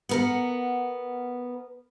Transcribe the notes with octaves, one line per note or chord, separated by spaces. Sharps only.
B3 A#4 F#5